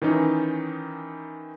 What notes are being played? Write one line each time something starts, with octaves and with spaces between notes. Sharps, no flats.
D#3 E3 C#4 D#4